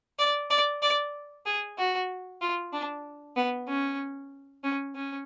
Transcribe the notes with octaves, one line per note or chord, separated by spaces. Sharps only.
D5
D5
D5
G#4
F#4
F4
D4
B3
C#4
C#4
C#4